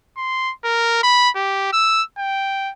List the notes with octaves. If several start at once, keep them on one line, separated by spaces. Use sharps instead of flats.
C6
A#4
B5
G4
E6
G5